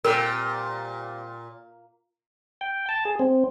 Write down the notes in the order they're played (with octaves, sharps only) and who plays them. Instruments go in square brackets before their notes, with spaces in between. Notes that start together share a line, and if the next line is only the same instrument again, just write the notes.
[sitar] A#2 [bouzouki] G3 C4 [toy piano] A#4
[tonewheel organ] G5
A5
G#4
C4